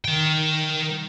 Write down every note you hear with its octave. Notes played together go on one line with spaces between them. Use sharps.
D#3 G5